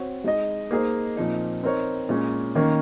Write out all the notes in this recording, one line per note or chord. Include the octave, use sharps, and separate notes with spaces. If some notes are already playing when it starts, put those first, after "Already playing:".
Already playing: C4 F#4 C#5
G#3 D#4 G#4 D#5
A#3 D#4 G#4 C5 D#5
A#2 F3 C4 D#4
C4 D#4 A#4 C#5
A#2 G#3 C#4
D#3 A#3 C#4